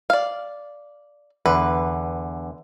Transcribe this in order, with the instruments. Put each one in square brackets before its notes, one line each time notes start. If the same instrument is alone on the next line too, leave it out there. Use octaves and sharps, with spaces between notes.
[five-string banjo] D5 F5
[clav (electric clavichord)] E2 D3 [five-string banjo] B4